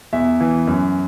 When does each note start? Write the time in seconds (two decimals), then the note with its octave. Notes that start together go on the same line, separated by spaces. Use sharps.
0.13 E2 E5
0.40 E3
0.67 F#2